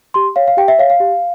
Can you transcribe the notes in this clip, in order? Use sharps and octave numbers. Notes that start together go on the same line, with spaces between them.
G4 C6
C#5 F5
F5
G4 G5
E5
C#5 F5
F5
G4